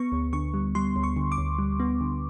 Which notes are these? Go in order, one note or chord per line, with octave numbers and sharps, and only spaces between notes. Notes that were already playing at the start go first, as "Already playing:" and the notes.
Already playing: B3 C#6
D2
D3 C#6
G3
G3 C6
D2
C#6
D3
D6
D2
G3
B3
D3